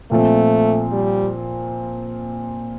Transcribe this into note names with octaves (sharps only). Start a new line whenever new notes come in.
A#2 F3 A3 C4
G3